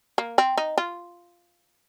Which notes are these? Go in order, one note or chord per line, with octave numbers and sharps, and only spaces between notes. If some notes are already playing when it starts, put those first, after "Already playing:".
A#3
C4
D#4
F4